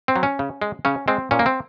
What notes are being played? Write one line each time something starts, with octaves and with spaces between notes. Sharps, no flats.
C4
F#3
C#4
C#3
G#3
C#3 C#4
G#3 C4
A#2 C#4
A#3
C4